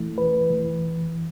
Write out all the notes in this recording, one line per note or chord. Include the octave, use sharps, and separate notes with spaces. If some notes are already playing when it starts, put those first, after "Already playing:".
Already playing: E3 A3 E4
B4
E3